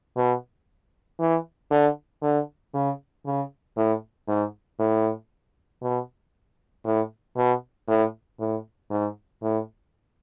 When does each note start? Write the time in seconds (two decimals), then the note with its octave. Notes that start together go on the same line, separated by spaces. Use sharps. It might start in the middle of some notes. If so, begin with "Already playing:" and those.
0.17 B2
1.20 E3
1.71 D3
2.23 D3
2.74 C#3
3.26 C#3
3.77 A2
4.28 G#2
4.79 A2
5.82 B2
6.85 A2
7.36 B2
7.88 A2
8.40 A2
8.90 G#2
9.42 A2